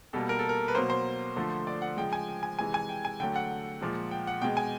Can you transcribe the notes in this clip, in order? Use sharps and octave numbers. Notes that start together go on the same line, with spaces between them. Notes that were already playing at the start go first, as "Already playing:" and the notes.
B2 G3 A#3 A4
A#4
A4
A#4
B4
B2 F#3 A#3 C5
C5
D3 F3 A3
D5
F#5
C#3 F3 G#3 G5
G#5
G5
G#5
C3 E3 G#3 G#5
G#5
G5
G#5
D3 F#3 A3 G5
F#5
A#2 F3 G#3
G5
F#5
B2 G#3 G5
G#5